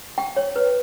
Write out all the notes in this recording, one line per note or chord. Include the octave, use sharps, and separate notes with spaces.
G5
C#5
B4